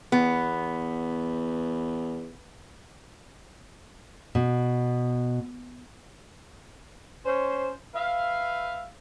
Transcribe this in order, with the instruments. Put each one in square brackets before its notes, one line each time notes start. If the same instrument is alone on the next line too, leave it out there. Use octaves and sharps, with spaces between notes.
[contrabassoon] E2 [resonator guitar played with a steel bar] B3
[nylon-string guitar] B2
[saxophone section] C#4 C5
B4 E5 F5